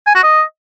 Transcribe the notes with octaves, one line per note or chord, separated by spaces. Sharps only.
G#5
F#4
D#5